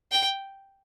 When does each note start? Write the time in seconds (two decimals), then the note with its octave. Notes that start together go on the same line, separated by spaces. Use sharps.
0.12 G5